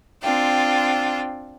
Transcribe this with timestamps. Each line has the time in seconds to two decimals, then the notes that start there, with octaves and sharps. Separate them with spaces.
0.22 C4 D4 F4 G5